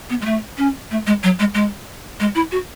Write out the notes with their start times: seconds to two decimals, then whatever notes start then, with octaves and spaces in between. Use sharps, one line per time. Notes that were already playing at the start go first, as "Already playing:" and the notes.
0.10 B3
0.21 G#3
0.25 A3
0.58 C#4
0.91 A3
1.07 G#3
1.23 F#3
1.39 G#3
1.54 G#3
2.20 G#3
2.35 E4
2.51 F#4